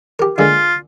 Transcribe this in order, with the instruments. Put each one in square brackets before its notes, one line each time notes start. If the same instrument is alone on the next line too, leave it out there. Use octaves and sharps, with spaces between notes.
[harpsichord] G4 A#4
[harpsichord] D3 G#3 A#3 [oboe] F4